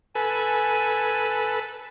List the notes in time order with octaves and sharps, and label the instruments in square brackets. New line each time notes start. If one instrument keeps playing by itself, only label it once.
[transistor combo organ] A4 B4 [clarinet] G#5